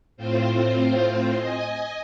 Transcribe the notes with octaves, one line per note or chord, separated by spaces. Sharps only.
A2 C4 F4 C5
D#5 G#5